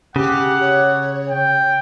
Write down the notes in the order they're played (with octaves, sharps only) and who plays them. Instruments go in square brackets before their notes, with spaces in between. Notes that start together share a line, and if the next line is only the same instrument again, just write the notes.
[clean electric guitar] C#3 [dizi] G4 [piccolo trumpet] F#5
[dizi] C#5
[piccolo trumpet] G5